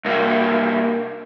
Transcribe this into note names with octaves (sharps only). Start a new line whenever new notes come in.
C2 A#3